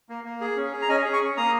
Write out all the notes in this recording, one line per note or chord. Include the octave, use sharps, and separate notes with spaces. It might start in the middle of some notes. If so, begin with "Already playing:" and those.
A#3
A#3
G#4
C#4
G#4
A#5
C#4 D#5 G#5
G#4
G#5 C#6
C#4
A#3 A#5 D#6